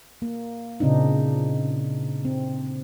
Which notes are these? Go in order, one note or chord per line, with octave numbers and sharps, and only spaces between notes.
A#3
A#2 C#3 C4 D4 D#4
C4